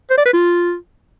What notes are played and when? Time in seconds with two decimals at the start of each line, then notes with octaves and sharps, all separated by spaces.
0.10 C5
0.18 D5
0.25 B4
0.33 F4